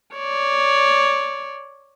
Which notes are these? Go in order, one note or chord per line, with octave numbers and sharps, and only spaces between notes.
C#5 D5